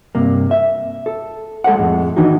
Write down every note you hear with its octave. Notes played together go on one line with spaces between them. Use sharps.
G2 C3 A#3
E5
A4
G#3 A4 C#5 F#5
F2 A2 G#3
D#3 E3 D4 D#4 F#4